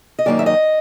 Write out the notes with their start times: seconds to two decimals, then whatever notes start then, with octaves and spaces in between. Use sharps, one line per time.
0.19 D#5
0.26 F#2 D#3 F#3 A#3 D#4 D5
0.39 E5
0.46 D#5